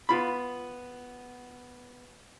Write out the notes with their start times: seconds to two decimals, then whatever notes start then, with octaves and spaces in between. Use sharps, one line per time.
0.09 B3 F4 B5